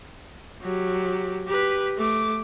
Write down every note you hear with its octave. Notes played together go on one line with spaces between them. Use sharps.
F#3 G4
G4 B4
A3 D6